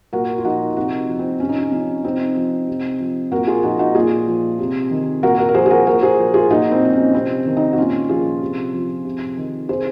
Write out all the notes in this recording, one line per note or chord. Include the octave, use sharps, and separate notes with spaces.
A#2 F#4 A#4
F4
F3 D#4 F#4
C3 D#4 F#4
F3
C4
C3 C#4
D#4
C#4
F3 C#4
C3 C4 D#4
F3
C3
F3
A#2 F#4 A#4
F4 G#4
F3 D#4 F#4
D#4 F#4
A#2 F4 G#4
F3
C3
D#3
A#2 F#4 A#4
F#4 A#4
A#4
F3 G#4 C5
G#4
F#4 A#4
A#2 F#4 A#4
G#4 C5
F3
F4 G#4
A#2 D#4 F#4
C4
F3 D#4
C#4
C3 C4
D#3
C4 D#4
F#4
A#2 C#4 F4
F3 F4 G#4
C3
F3
C3
D#3
C3 G#4 C5